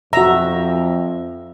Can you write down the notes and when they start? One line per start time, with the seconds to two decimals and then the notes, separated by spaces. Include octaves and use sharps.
0.13 F2 F#4 E5 A#5